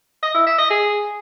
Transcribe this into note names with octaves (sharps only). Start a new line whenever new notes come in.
D#5
E4
E5
D#5
G#4